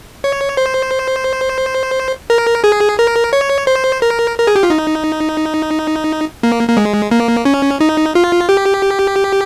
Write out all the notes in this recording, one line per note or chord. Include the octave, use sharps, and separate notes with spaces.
C#5
C5
A#4
G#4
A#4
C#5
C5
A#4
A#4
G#4
G4
F4
D#4
A#3
A#3
G#3
A#3
C#4
D#4
F4
G4